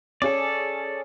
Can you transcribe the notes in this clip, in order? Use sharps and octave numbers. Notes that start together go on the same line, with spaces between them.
C#4 G#4 A4 D5